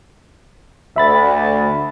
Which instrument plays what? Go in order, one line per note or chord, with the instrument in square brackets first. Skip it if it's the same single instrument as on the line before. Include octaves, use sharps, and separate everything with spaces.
[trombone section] D2 [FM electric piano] E5 B5 A6